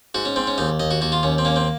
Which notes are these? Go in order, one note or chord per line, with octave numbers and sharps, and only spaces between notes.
G#2 F#4
C#4
G#2 C4
C#4
D#2 D#4
D#2 D#5
F#4
D#2 F#4
F4
D#2 C#4
C4
A#3 C#4
C4